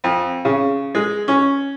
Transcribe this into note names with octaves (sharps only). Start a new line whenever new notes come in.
F2
C#3
G#3
C#4